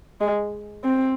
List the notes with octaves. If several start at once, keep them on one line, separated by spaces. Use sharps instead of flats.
G#3
C4